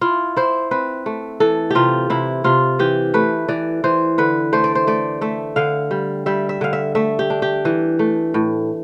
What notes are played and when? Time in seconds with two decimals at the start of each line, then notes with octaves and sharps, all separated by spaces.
0.01 E4 F4
0.36 E4 C5
0.71 C4 B4
1.06 A3
1.40 E3 A4
1.70 C3 F4 G4
2.10 C3 E4
2.44 C3 F4
2.79 E3 G4
3.14 A3 B4
3.48 E3 D5
3.84 E3 C5
4.18 D3 B4
4.53 A3 C5
4.64 D5
4.75 C5
4.87 A3 D5
5.21 A3 E5
5.56 D3 F5
5.91 G3
6.26 G3 E5
6.49 E5
6.61 D3 F5
6.73 E5
6.95 A3 E5
7.19 G4
7.30 D4
7.42 G4
7.65 E3
7.99 A3
8.34 A2